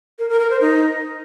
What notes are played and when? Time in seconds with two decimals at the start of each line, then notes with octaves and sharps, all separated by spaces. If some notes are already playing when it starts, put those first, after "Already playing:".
0.19 A#4
0.29 A#4
0.40 A#4
0.50 C5
0.61 D#4